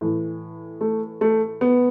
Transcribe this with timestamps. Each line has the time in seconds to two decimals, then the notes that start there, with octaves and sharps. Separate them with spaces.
0.01 A2 E3
0.81 A3
1.21 A3
1.61 B3